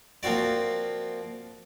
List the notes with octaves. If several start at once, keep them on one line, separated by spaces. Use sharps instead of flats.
F3 A#3 C4 F#4 D5